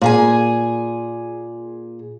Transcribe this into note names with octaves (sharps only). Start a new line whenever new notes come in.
A#2 G#4 G#5